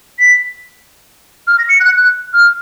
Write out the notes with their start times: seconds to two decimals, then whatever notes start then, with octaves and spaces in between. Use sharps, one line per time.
0.19 B6
1.47 F6
1.59 A#6
1.69 C#7
1.80 F#6
1.91 F#6
2.33 F6